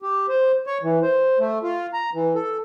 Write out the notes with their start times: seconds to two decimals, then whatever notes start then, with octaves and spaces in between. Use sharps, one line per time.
0.02 G4
0.29 C5
0.67 C#5
0.83 E3
1.02 C5
1.39 A3
1.63 F4
1.94 A#5
2.14 E3
2.35 A4